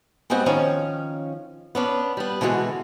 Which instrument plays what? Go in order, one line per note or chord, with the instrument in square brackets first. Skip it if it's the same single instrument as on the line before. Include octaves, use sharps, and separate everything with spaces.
[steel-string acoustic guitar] G3 G#3 B3 C4 F#4
D#3 F3 C#4
B3 C#4 D4
G3 B3
B2 D3 E3 G#3 F#4